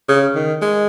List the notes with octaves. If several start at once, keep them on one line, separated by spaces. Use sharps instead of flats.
C#3
D#3
G#3